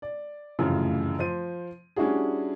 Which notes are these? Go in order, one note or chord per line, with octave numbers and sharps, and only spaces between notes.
D5
F1 F#2 A2 C#3 E3 F3
F3 C5 D#7
G3 C#4 D4 E4 F#4 G#4